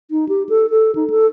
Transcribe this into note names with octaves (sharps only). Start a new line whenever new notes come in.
D#4
G4
A4
A4
D#4
A4